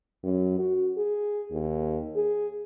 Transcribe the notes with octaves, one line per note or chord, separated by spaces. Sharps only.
F#2
F#4
G#4
D#2
G#4